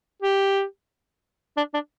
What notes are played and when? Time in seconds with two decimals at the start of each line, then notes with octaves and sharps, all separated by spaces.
0.23 G4
1.57 D4
1.74 D4